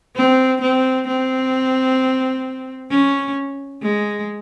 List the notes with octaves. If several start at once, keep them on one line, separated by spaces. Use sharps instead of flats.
C4
C4
C4
C#4
G#3